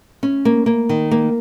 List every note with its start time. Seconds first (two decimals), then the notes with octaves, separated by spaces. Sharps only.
0.23 C#4
0.45 A#3
0.66 A#3
0.89 D#3
1.11 A#3